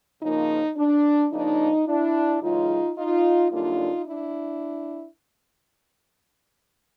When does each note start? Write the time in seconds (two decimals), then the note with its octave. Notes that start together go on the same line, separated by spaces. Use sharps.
0.22 C#3 F3 A#3 D#4
0.77 D4
1.32 C#3 F3 A#3 D4 D#4
1.87 D4 E4
2.42 F#2 C#3 E3 G#3 D#4 F4
2.97 D#4 F4
3.51 F#2 D3 G3 A#3 D4 D#4 F4
4.06 D4 E4